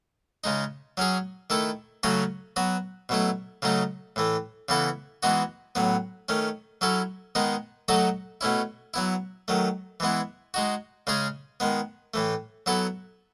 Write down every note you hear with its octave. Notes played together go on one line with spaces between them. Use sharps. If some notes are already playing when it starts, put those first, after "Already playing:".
C#3 G#3 D#4
F#3 C#4 G#4
D#3 A3 E4 A4
C#3 F#3 A3 C#4 F#4
F#3 B3 F#4
B2 F#3 A3 E4
C#3 F#3 A3 D#4
A2 E3 A3
C#3 E3 B3 E4 A4
E3 G#3 B3 D#4 F#4
A2 F#3 B3
D#3 A3 C#4
F#3 C#4 E4 A4
D#3 G#3 B3 D#4
F#3 A3 D#4 F#4 A4
B2 A3 C#4 E4
F#3 B3 E4
D#3 F#3 A3
E3 G#3 B3 E4
G#3 D#4 F#4
C#3 G#3 C#4 G#4
D#3 G#3 B3
A2 E3 A3
F#3 B3 E4 A4